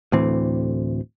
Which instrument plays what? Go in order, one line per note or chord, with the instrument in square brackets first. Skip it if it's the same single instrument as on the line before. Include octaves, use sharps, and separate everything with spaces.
[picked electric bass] D2 A2 E3 C4